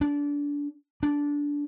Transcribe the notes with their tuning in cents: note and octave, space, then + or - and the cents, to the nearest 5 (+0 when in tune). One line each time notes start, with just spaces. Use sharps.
D4 -25
D4 -15